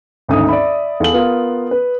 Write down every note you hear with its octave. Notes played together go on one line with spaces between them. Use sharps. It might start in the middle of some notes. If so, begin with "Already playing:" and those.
G#1 D2 D#3 C#4 D#4 D#6
D5 E5 B5
E2 A4 F5 F#7
B3 F4 A#4
B4